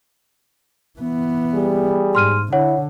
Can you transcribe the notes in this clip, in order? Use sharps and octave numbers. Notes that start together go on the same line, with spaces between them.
E3 B3
G3 G#4
G#2 C6 F6 D#7
D3 E4 C#5 F#5